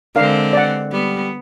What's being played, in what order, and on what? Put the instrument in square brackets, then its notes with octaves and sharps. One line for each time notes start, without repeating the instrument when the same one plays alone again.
[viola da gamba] D3 G#3 C4 [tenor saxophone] D4 [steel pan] A#4 F5
[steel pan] D5 F#5
[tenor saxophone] G3 [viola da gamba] B3